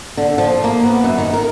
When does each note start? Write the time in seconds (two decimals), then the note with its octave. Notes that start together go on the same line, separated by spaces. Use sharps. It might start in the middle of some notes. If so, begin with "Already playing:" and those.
0.17 D3
0.38 F3
0.64 A#3
0.84 B3
1.04 F#2
1.18 D#3
1.34 A#4